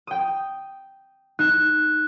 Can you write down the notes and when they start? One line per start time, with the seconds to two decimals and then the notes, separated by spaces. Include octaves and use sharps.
0.07 G5 D#6
1.39 D#4 F#6